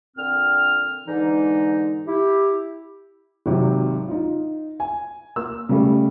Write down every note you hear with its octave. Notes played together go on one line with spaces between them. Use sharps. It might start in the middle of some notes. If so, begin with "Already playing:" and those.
A#2 D3 C4 F6
G#2 D3 E3 G#3 D#4
E4 G4
G#1 C3 F#3
D#4 F4
G#5
A#3 E6
C#3 G3 A3